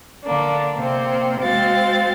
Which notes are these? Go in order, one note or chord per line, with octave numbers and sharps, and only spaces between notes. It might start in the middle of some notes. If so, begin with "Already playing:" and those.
D3 A#3 D4
C3 A#3 C4
G#3 C4 F#4 F5 A6